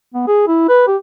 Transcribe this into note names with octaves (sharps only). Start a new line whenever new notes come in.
B3
G#4
E4
B4
G4